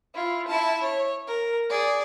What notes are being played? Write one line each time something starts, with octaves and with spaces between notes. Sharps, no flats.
E4 F4
E4 A5
C#5
A#4
G#4 D5